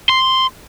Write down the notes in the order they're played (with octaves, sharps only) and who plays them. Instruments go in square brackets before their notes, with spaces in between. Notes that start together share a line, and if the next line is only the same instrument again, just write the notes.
[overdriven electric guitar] C6